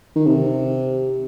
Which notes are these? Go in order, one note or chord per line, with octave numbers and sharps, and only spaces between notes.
D#3
C3